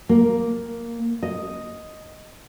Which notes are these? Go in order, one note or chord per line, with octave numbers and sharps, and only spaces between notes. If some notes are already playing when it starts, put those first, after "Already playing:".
A#3
D#5